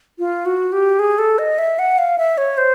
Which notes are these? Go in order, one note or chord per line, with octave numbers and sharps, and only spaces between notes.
F4
F#4
G4
G#4
A4
D#5
E5
F#5
F5
E5
C#5
C5